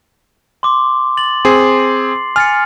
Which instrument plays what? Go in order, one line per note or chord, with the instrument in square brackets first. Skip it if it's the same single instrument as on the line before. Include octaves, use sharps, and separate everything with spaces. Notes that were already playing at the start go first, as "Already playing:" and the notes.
[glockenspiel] C6 D6
A6 F#7
[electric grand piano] C4 G#4 [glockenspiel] C6 C7
[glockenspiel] G#5 A6 C#7 [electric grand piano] F6